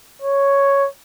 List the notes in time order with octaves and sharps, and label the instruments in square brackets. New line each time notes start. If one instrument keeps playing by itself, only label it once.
[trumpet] C#5